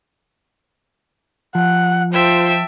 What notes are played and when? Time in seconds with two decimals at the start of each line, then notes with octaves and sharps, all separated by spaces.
1.55 F3 F#5
2.13 F4 C5 E5 G5 A5